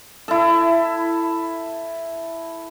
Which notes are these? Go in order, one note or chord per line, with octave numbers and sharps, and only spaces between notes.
E4 A4